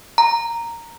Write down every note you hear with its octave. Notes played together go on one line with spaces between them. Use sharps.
A#5